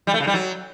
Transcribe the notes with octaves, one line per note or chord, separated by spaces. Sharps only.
G3
A3
C#3
G3
F#3